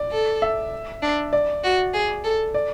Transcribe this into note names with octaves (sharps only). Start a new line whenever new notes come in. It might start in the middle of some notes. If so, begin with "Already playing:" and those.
Already playing: D5
A4
E5
D4
D5
F#4
G#4
A4
D5